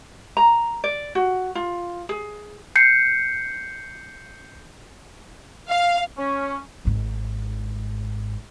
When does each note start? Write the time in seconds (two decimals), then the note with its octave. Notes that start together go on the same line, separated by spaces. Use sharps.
0.37 A#5
0.84 D5
1.15 F#4
1.55 F4
2.09 G#4
2.76 G6 C7 C#7
5.69 F5
6.18 C#4
6.85 G#1 G#2